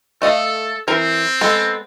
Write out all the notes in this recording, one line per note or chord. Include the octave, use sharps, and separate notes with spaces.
A3 A4 D#5 F5
E3 C4 A#4
G#3 B3 A4